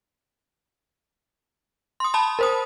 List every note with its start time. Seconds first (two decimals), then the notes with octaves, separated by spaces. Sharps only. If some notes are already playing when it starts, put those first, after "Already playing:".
2.00 C6 D#6
2.14 A5 B5
2.39 A#4 C5 D#6